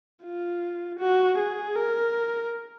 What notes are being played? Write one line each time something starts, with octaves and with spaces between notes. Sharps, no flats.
F4
F#4
G#4
A#4